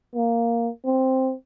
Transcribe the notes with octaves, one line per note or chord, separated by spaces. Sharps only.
A#3
C4